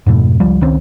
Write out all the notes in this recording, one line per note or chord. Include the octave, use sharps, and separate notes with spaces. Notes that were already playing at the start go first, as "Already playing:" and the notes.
F2 G#2 B2 A3
C#2 F3 G3
C#2 D#3 C4 C#4